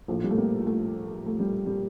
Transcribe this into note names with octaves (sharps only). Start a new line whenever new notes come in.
A#1 A2 F3 A3
G3
A3
A#3
A3
A3
G3
G3